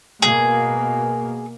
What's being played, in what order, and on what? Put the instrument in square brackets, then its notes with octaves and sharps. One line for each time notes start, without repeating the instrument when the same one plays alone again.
[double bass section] B2 A#3 [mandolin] G#4